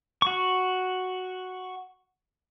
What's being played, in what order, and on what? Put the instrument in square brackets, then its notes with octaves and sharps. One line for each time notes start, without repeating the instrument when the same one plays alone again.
[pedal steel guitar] F#4 C#6